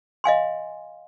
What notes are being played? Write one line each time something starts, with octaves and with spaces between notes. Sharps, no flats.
D#5 F5 G#5 C6